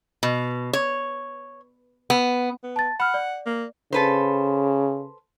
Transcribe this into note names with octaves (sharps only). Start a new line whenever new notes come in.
B2
C#5
B3
B3
A5 A6
F#5 B5 F6
D5
A#3
C#3 A4 B4 C5